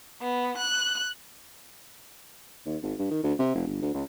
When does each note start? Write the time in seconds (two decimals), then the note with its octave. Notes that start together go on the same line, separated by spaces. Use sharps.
0.21 B3
0.58 F#6
2.66 D#2
2.83 G#1
2.99 G2
3.11 D#3
3.23 D2
3.39 C3
3.55 F1
3.67 G1
3.82 D2
3.94 C#2